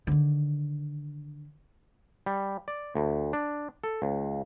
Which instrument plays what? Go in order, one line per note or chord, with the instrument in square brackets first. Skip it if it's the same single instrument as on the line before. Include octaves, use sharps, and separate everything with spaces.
[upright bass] D3 D#3
[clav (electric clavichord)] G3
D5
D2
D4
A4
C#2